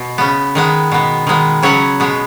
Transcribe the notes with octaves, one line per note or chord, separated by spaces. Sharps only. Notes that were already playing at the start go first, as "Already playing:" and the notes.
Already playing: B2
C#3 B3
D#3 G#3 B3
B2 B3
D#3 G#3 B3
C#3 F#3 B3 C#5 F#5
B2 G#3 B3